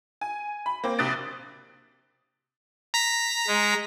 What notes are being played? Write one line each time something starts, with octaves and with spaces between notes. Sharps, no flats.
G#5
B5
A#3 C4 G5
A#1 C3 D#6 F#6 A6 D7
A#5 B6
G#3